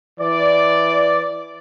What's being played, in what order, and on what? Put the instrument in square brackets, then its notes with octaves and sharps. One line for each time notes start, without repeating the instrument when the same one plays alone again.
[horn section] E3 D5